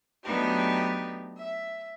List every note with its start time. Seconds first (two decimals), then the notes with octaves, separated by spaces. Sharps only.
0.24 F#3 A3 B3 D4 D#4 G4
1.39 E5